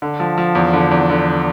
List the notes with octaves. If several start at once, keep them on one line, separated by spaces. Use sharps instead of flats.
D3
F3
F3
E2
D3
E2
D3